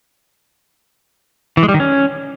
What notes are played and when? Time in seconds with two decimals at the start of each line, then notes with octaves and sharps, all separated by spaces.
1.57 E3
1.63 G#3
1.69 G3
1.74 D#3
1.80 C#4